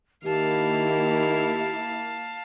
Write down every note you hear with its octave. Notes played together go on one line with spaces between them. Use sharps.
D#3 A#3 E4 G4 F5 A5